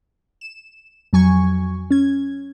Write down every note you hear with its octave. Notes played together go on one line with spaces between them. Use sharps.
E7
F2 F#3 G#5 C#6 G#6
C#4 G#6